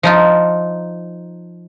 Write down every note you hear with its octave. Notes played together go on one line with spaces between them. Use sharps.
F3 D#4 F4